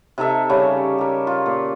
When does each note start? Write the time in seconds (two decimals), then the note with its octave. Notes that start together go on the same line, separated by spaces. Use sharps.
0.18 C3 D#4 A4 E5
0.49 C#3 G3 C#4
0.98 G4 A#4
1.27 F4
1.46 A#2